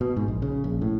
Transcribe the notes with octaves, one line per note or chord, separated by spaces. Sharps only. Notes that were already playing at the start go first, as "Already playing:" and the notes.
B2
G#2
A#1
C#3
A#1
A2